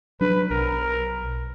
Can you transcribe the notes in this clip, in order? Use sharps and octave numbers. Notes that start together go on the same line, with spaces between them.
F#3 D4 B4
B1 A#4